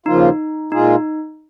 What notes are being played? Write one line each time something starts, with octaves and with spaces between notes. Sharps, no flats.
D#2 C#3 F3 A#3 D#4 F4
A#2 G#3 D#4 F4 G#4
D#4